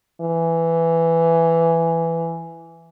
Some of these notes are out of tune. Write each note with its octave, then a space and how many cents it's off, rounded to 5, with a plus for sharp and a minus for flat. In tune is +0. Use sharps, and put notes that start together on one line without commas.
E3 +10